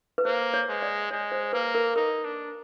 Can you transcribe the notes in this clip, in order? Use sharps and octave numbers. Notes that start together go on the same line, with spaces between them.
B4
A#3 C5
C#5
G#3
D5
G#3 C#5
C5
A#3 B4
A#4
D#4 A#4
D4